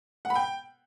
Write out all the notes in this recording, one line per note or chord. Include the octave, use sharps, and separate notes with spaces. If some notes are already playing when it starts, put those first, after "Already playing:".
F#5
B5
G5